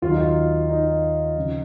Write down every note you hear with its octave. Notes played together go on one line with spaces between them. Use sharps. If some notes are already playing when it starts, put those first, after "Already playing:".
D#2 D#3 F#3 F4
D#4
F4
D#4
C#3 F3